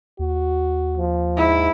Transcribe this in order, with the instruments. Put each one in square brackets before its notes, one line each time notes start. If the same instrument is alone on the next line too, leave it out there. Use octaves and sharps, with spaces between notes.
[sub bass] D#2 [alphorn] F#4
[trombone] F3
[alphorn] G#2 [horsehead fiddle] E4